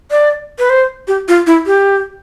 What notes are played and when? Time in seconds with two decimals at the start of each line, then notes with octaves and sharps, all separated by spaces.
0.11 D5
0.59 B4
0.70 C5
1.08 G4
1.28 F4
1.47 E4
1.66 G4